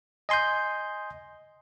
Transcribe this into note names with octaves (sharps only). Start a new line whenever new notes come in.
D#5 G#5 C6 D#6 G6